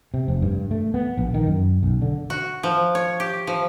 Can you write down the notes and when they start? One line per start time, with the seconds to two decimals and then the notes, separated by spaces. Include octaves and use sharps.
0.14 C3
0.28 F1
0.42 G2
0.71 A3
0.94 B3
1.18 A#1
1.34 D#3
1.46 F#2
1.83 B1
2.02 D3
2.30 F#4
2.63 F3
2.95 C#5
3.20 G4
3.47 F3